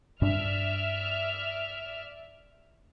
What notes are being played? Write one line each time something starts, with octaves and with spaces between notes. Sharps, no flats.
G2 D4 D5 E5 F6